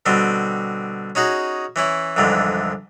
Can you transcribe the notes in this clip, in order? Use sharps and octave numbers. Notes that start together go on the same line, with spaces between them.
B2 D3 G3 C4
C#4 D#4 F#4 G#4
E3 C#4 E4
C2 F2 G#2 D3 E3